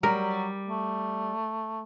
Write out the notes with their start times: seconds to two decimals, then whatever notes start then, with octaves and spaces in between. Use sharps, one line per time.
0.03 F#3 G3 A#4
0.67 A3